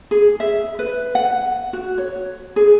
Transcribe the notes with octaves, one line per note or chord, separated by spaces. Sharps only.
G#4
E5
B4
F#5
F#4
C#5
G#4